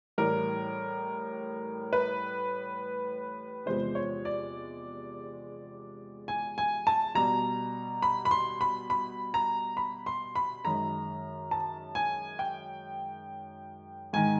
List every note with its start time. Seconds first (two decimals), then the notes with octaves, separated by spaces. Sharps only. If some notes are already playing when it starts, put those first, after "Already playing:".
0.18 A2 E3 G3 A#4
1.93 B4
3.66 E2 C3 F3 G#3 C5
3.95 C#5
4.25 D5
6.28 G#5
6.58 G#5
6.87 A5
7.15 B2 G3 A#5
8.02 B5
8.25 B5
8.31 C6
8.61 B5
8.90 B5
9.34 A#5
9.77 B5
10.06 C6
10.36 B5
10.65 F#2 D#3 G#3 A#5
11.51 A5
11.95 G#5
12.39 G5
14.13 G#2 D#3 G#3 G#5